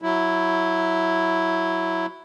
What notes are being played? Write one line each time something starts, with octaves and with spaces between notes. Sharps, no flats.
F#3 E4